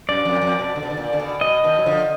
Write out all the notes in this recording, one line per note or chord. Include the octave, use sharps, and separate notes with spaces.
F#2 D5
F2
F2
B2
D3
B2
D3
A#2
D3
B2
B2 D#5
B2 D#3
F#3
D3 F3